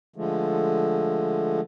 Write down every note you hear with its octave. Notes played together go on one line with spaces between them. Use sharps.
D3 F3 G#3 A3